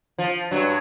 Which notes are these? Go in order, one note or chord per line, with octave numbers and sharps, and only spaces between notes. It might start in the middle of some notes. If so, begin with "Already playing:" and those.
F3
G2 F#3